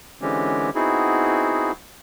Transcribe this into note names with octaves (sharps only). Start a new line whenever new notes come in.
D3 E3 G#3 C4 C#4 G4
B3 C4 D#4 E4 F#4 G#4